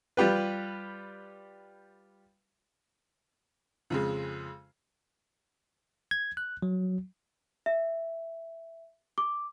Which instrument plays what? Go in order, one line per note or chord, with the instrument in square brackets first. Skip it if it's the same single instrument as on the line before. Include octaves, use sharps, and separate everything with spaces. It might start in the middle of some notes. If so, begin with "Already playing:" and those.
[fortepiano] G3 F4 G4 B4
[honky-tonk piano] F2 C#3 G#3
[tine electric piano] G#6
F#6
F#3
[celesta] E5
D6